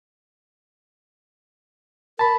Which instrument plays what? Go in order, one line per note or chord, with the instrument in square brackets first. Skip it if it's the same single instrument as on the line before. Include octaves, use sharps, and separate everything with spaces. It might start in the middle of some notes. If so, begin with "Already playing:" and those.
[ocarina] A#4 [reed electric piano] A5 B5